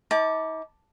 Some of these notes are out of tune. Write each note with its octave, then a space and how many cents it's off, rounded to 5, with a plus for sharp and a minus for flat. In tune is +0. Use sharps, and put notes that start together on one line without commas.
D#4 +45 A5 +0 D6 +0